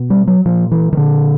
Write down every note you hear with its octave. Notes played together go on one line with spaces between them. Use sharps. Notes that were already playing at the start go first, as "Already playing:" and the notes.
Already playing: B2
G3
F#3
A#2 F3
E3
D#3
A#2 D3